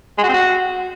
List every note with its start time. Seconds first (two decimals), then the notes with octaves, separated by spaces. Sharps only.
0.18 G#3
0.23 F#4
0.28 C4
0.34 F#4